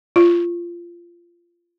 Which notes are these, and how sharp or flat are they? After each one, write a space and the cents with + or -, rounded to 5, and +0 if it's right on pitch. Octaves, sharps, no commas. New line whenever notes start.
F4 -15